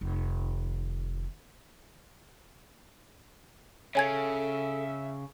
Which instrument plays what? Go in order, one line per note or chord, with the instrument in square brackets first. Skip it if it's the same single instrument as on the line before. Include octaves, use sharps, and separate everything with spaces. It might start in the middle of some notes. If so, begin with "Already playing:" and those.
[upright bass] F1 D#3
[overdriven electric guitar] C#3 [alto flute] A4 [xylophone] C#5 G#5 G#6 [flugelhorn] E5